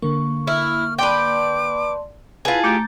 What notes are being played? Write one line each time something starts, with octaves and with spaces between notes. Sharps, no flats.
D3 A#3 C#6
E4 F6
B4 D5 G5 A5 C6 D6
E4 F4 G#4 B4 A5
A3 G4 A#5 D6 G6 A6